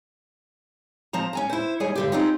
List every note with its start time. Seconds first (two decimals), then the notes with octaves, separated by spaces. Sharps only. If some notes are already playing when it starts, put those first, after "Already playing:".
1.13 F3 C4 A5 A#5
1.33 C#4 G#5 A#5
1.49 E4 C5
1.80 D#2 G3 G#4 C#5 G#5
1.95 G2 D3 G4
2.12 C4 C#4 D#4 F4 G4